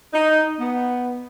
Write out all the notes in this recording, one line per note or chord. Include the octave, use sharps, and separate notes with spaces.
D#4
B3